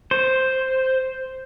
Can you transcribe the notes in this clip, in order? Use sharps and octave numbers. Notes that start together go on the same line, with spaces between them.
C5